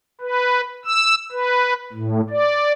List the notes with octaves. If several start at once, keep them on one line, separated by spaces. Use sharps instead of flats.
B4
E6
B4
A2
D5